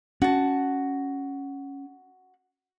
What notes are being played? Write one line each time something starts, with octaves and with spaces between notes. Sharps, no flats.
C#4 F#4 A5